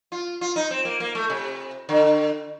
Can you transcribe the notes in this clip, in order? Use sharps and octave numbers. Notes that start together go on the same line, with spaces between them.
F4
F4
D#4
C4
A#3
A#3
A3
C3
D3